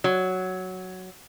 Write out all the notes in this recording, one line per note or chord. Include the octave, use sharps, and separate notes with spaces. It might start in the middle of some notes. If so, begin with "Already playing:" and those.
F#3